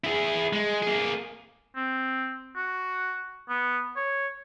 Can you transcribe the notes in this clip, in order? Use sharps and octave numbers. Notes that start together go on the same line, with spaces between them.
E4 G#4
G#3
A#3 G#4
C4
F#4
B3
C#5